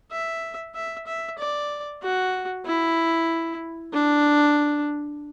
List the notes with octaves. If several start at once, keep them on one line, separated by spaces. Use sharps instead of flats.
E5
E5
E5
D5
F#4
E4
D4